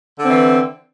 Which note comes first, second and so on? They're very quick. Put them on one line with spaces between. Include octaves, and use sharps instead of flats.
D3 C4 E3